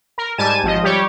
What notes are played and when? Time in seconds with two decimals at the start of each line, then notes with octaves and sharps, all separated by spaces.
0.18 A#4
0.38 G#2 G3 G#5 A5 D#7 E7
0.63 G#1 F3 D#5
0.83 G3 G4 C#5